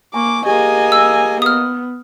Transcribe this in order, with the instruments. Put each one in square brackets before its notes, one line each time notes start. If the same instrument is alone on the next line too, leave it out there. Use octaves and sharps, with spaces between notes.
[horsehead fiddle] A#3 [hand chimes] G#5 C#6 [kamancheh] D6
[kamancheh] A#3 D#5 [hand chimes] G4 G#4 [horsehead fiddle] G#5
[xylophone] E6
[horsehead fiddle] B3 [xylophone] D#6 F6